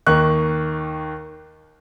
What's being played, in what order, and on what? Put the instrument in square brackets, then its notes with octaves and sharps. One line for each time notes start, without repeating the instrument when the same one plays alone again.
[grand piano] D#2 D#3 C#6 F#6